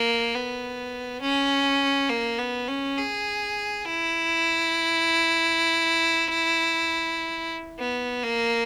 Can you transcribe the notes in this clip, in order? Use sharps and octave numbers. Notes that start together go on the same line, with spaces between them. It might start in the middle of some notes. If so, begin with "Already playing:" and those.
Already playing: A#3
B3
C#4
A#3
B3
C#4
G#4
E4
B3
A#3